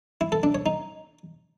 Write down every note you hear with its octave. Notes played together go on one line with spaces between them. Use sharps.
E4
A4
D4
C#5
D#4